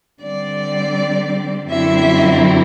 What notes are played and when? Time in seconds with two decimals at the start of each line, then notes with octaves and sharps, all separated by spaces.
0.22 D3 G3 C4 D5
1.68 F#2 D3 F#3 C4 E4 E5